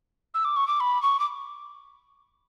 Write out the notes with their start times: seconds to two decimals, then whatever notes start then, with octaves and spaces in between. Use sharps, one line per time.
0.34 E6
0.45 D6
0.56 C#6
0.68 D6
0.80 B5
1.03 C#6
1.20 D6